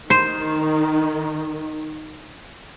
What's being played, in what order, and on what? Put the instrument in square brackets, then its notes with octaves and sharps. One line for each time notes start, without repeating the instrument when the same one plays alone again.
[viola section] D#3 [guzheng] C5